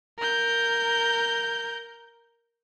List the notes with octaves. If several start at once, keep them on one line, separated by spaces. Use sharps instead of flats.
A#4 G6